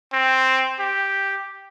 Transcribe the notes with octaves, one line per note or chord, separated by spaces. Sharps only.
C4
G4